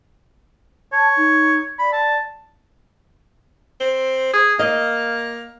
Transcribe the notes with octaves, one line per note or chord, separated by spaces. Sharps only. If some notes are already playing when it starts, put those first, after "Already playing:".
C#5 A5
D#4
D5 B5
A5
C4
G#4
A#3 D#5